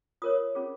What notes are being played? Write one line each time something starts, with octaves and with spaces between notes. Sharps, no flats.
F4 A#4 C#5 D#6
C#4 F4 G#4